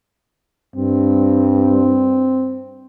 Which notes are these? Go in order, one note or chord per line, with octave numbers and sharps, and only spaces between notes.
G2 C4